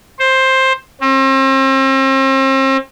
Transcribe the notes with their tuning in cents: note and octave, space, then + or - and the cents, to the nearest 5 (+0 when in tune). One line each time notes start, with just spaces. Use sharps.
C5 +10
C4 +40